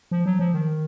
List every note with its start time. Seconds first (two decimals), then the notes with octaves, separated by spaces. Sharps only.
0.11 F3
0.26 F#3
0.39 F3
0.54 D#3